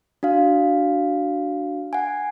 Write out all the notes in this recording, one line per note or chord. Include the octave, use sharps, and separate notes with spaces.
D4 F#4 F5
F#5 G#5